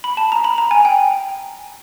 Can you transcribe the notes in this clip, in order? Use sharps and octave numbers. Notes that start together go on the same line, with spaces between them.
B5
A5
A#5
B5
A#5
G#5
G5